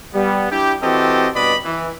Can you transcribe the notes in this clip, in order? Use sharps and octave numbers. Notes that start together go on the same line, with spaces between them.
G3 B3
D4 E4 G4
E3 C4 F#4 G4 A4 D#5
G2 B2 B4 D5 D#5 B5
E3